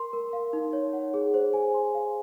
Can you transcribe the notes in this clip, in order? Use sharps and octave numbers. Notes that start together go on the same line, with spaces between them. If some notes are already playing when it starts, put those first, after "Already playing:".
Already playing: A#4 C6
A#4
F5
D#4
C#5
F#5
G#4
C5
G#5
C6
F5